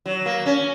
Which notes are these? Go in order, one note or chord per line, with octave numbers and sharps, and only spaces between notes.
F#3
A#3
C#4